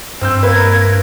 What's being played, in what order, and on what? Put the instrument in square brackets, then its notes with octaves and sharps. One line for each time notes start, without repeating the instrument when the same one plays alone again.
[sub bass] G2 [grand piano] C4 E6 G6
[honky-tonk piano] A#3 B4 [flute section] A#4 G#6